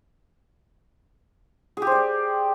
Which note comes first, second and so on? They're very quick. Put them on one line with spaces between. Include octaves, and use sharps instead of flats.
G#4 G4 C5 D5